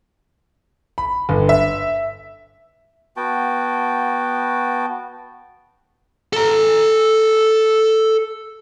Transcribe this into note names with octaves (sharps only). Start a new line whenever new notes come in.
B5
G1
E5
B3 F#4 G5 A5
A4 A#5